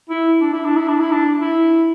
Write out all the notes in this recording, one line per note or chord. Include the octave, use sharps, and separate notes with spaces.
E4
D4
E4
D4
E4
D4
E4
D4
E4